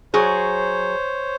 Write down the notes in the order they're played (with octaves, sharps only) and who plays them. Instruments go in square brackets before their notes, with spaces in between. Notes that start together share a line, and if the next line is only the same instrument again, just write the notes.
[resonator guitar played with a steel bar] F#3 G#4 [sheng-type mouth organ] C5 C#5